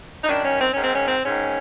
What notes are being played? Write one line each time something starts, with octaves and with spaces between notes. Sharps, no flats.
D#4
F#2 D#3 D4
C#4
C4
G#2 D#3 C#4
C4
C#4
C4
G#2 D#3 C#4